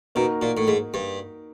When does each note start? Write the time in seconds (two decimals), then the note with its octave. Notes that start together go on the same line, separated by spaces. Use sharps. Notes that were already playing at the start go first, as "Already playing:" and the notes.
0.15 B2 A#3 D#4 F#4 A#4
0.42 A#2
0.57 A2
0.68 G#2
0.94 G2